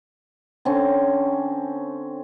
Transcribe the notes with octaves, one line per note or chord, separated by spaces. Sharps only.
D3 C4 C#4